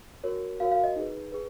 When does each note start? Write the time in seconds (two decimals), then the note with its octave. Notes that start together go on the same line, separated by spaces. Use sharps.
0.24 F#4 A#4 C#5
0.60 F#4 A#4 C#5 F5
0.72 F5
0.84 D#5
0.96 D#4 G#4 B4
1.32 G#4 B4